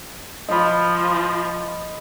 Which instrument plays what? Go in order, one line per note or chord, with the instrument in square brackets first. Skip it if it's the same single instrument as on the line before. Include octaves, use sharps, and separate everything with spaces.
[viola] F3 [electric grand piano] D#5 B5